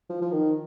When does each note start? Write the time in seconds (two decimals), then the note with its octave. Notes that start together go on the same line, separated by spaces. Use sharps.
0.10 F3
0.22 F3
0.32 D#3